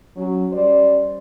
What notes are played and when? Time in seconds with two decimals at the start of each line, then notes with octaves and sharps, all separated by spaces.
0.17 F#3 C#4
0.53 G3 C#4 C5 D5